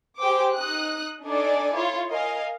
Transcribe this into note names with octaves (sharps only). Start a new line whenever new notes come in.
G4 G#4 C5 G5 D6
D#4 D#6 F#6
D4 D#4 A4 D5 G#5 D6
E4 F4 C#5
A#4 D#5 F5 G#5